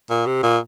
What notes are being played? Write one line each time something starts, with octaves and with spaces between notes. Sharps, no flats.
A#2
C3
A#2